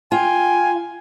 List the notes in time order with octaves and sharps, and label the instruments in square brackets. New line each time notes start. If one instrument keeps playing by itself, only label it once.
[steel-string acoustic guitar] F4 [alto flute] G5 [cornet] G#5